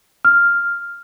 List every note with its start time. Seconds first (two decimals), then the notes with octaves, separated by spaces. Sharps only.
0.25 F6